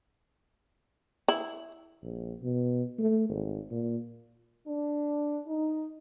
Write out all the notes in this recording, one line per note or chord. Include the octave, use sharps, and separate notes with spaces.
E4
A#1
B2
A3
G#1
A#2
D4
D#4